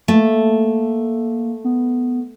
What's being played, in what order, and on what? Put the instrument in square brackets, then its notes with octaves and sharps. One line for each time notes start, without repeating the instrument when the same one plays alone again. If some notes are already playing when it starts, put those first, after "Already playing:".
[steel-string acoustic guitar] A3 [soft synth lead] A#3
[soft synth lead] B3